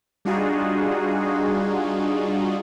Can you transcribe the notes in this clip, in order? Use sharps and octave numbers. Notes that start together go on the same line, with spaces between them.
G3 D4 D#4 F4 F#4 G#4